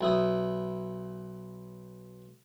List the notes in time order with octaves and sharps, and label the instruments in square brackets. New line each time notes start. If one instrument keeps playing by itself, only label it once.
[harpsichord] B1 E4 D#6